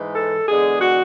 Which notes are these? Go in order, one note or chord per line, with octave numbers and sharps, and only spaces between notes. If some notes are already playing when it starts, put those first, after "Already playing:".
Already playing: G#2 E3 G#3
A4
E2 D3 G#3 G#4
F#4